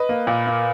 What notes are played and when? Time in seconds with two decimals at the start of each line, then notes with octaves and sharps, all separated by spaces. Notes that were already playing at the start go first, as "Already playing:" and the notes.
Already playing: B4 D#5
0.09 A#3
0.27 A#2
0.47 A#3